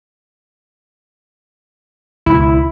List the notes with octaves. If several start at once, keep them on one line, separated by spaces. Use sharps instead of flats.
C#2 B2 E3 E4